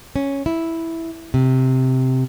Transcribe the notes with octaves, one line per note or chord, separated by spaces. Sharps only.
C#4
E4
C3